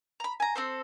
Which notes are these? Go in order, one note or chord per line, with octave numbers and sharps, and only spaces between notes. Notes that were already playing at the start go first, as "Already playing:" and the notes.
A#5 B5
G#5 A#5
C4 A4 C5